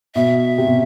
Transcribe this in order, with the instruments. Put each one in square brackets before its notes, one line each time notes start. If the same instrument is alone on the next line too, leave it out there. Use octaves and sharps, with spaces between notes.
[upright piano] B2 [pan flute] E5
[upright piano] C3
B2